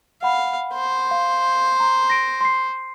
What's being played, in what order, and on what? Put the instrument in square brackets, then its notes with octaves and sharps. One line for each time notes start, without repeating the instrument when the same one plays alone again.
[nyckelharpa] F5 [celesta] F#5 B5
[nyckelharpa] C5
[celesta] F5
A#5
A#6 D7
C6 C7